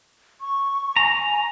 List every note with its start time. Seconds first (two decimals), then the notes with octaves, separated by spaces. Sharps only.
0.41 C#6
0.96 G#5 A#5